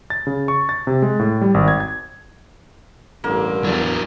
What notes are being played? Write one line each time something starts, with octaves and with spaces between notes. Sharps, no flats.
A6
C#3
C#6
A6
C3
G#3
A2
G3
G#1
G#6
G#6
A1 G2 D3 A#3
E2 F#3 D4